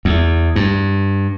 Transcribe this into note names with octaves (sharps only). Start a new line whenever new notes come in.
E2
G2